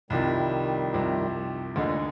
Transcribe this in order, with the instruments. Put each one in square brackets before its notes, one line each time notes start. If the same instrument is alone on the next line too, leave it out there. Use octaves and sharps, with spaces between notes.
[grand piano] C2 C3 F3 [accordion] D#3 G3
[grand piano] C2 C3 F3
[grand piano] D2 D3 G#3 D#4 G#4 [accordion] A#2